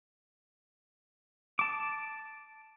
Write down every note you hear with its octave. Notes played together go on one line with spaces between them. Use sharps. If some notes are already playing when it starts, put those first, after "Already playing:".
A5 D6